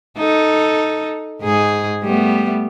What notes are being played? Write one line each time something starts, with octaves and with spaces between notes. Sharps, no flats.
D#4 A4
G#2 D#4 G#4
G3 A3 B3